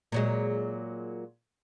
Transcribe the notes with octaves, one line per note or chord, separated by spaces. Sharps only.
A#2 F#3 G#3